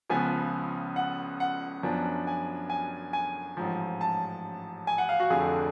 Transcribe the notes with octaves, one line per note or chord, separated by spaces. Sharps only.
C#2 C#3 F3 B3 G#5
F#5
F#5
F#2 F3 B3 D4
G#5
G#5
G#5
A1 G#2 F3
A5
G#5
F#5
F5
F#4
F1 F2 D3 G#4